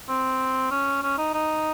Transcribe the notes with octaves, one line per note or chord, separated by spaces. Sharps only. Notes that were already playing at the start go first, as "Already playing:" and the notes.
C4
C#4
C#4
D#4
D#4